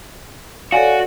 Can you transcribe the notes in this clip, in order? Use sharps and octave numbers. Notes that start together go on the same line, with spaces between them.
F#4 A4 C#5 D5 F5 G#5